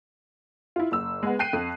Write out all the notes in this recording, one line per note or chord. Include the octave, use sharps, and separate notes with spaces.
E4 F4
F#1 E6
G#3 B3
G5 F#6 C7 D#7
F2